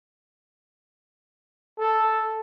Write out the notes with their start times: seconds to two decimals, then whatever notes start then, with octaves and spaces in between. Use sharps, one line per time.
1.79 A4